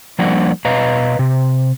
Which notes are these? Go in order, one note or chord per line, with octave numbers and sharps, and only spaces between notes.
F3 G3 A#3 D4 F#5
B2 B4 D#5 F5 A#5
C3